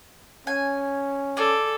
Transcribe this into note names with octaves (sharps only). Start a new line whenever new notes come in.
C#4 G#5
G#4 A4 D5